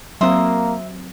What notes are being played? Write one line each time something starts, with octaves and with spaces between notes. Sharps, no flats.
F#3 A#3 C4 E5 C6 D#6